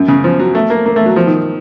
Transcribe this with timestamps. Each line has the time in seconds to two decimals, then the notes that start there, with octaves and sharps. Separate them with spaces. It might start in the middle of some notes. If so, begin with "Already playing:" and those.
Already playing: F#2
0.08 C#3
0.24 F3
0.39 F#3
0.55 A3
0.70 A#3
0.86 A#3
0.96 A3
1.06 F#3
1.16 F3
1.26 D#3